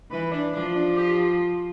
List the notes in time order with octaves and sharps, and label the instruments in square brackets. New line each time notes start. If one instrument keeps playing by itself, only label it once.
[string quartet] E3 [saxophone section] B4
[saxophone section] D4
[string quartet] F3 [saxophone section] D4
[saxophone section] D4
G4